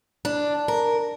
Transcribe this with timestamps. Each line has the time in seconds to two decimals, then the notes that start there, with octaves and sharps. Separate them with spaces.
0.25 D4
0.68 A#4